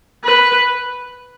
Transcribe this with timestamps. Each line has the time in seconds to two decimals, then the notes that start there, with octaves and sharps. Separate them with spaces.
0.24 B4